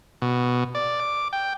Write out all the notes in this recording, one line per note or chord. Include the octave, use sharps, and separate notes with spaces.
B2
D5
D6
G5